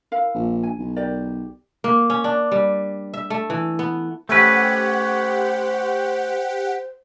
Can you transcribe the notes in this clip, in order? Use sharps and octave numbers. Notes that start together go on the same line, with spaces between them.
E4 A#4 F5
A#1
G#5
B1
G4 A#4 D5
A#3
C#4
D4
G3
E5
A3
E3
B3
A3 C#4 G4 B4 C5 F#5